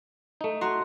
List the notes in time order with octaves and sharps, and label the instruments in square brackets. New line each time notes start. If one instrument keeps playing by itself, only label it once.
[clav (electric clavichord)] A3 D#4
[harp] F#4 A#5 C6